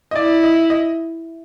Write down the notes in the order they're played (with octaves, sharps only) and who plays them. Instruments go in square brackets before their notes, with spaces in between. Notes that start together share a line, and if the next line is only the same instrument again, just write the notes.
[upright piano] D#5
[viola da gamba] E4 [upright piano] D5
[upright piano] D#5
D#5